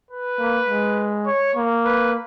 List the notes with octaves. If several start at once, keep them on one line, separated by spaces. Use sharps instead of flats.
B4
A#3
G#3
C#5
A#3
B4